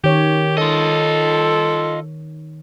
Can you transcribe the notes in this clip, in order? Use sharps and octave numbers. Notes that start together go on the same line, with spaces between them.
D#3 G4 C#5
F4 A4 D#5